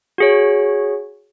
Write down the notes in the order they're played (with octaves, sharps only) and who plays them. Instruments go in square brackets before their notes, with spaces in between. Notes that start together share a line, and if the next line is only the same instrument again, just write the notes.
[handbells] F#4 G#4 C#5